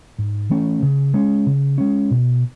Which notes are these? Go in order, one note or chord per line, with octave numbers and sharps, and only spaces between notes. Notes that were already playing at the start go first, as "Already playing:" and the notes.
G#2
E3 A3 C#4
C#3
G#3 C#4
C#3
G#3 C#4
B2